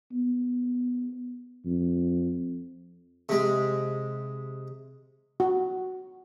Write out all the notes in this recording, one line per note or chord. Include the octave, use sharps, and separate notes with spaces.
B3
F2
C3 G#3
F#4